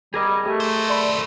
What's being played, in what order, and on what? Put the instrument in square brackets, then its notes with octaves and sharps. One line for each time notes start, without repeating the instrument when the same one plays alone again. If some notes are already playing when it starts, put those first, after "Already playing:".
[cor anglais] G3 [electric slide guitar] G#4 A#4 D#5
[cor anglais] A3 [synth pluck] G4
[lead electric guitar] F#3 C5
[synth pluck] D5 B5